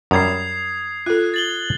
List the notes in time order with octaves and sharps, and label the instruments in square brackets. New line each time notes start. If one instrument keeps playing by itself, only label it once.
[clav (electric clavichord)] F#2 G3 [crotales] D#6 G#6 C7
[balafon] F4 A4 [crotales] F#6
[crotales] A6 F#7 G7